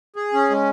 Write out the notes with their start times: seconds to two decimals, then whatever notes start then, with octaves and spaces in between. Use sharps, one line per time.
0.16 G#4
0.33 C#4
0.50 G#3